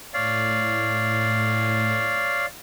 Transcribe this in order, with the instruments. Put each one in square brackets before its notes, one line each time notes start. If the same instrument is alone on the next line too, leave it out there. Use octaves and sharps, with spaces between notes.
[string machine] A2 [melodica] C#5 D5 F5